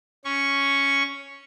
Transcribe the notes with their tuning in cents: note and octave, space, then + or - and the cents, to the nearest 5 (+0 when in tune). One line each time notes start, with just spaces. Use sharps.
C#4 +0 C#6 +0